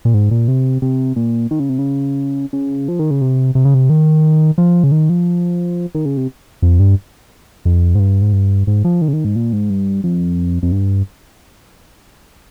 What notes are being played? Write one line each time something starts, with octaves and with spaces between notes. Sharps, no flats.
A#2
G#2
A#2
C3
C3
A#2
D#3
C#3
C3
C#3
C#3
F3
D#3
C#3
C3
C3
C#3
C3
D#3
F3
C#3
D#3
F3
D#3
C#3
C3
F2
G2
F2
G#2
G2
G#2
G2
G#2
F3
D#3
C#3
D#3
G#2
A#2
G#2
G2
F2
F2
G2